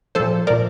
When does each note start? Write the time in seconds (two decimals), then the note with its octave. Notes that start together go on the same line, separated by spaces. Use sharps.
0.15 A#2 F3 A4 C5
0.47 A#2 F3 A#4 D5